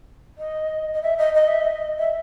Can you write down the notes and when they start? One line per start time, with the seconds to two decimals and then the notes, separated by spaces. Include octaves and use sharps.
0.38 D#5
0.94 D#5
1.03 E5
1.18 D#5
1.35 D#5
1.48 E5
1.61 D#5
1.99 E5